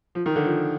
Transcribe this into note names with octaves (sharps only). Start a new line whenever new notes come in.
F3
D#3
D3
F3